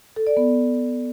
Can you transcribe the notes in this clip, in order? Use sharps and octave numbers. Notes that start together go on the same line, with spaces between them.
A4
D5
B3